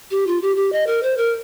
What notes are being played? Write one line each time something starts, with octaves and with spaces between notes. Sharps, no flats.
G4
F4
G4
G4
D#5
A#4
C5
A#4